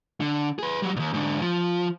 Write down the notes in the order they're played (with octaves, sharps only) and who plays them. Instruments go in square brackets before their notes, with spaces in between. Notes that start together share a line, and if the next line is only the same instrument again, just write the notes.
[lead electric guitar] D3
G#4 B4
F#3 G3
D#2 A#2
G#2 D3
F3